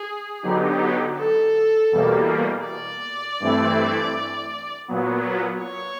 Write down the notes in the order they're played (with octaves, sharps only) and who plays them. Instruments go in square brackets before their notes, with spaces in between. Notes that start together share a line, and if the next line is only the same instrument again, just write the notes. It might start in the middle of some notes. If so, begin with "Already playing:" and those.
Already playing: [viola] G#4
[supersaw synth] D3 F#3 B3 D#4 G4
[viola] A4
[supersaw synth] E2 B2 G3 A#3
[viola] D5
[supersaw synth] G2 E3 A3 C4 E4
A#2 F#3 B3
[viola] C#5